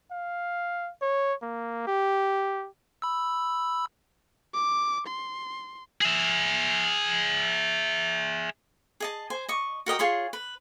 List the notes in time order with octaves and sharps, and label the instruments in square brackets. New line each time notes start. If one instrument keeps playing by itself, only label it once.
[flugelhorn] F5
C#5
A#3
G4
[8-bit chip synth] B5 E6
[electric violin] D6
C6
[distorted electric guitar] G#4 E5
[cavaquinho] G#4 D#5 A5
C5 G#5
D#5 C#6
F#4 A#4 D#5 G5
F4 G#4 C#5 C6
B4